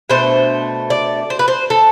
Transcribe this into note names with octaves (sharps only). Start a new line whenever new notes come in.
B2 A3 D4 C5
D5
C5
B4
C5
A4